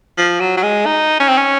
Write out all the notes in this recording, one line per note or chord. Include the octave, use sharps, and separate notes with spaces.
F3
F#3
F#3
G#3
D#4
C#4
C4
C#4